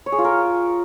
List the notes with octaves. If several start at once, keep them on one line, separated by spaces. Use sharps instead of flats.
C#5
G#4
F4
A#4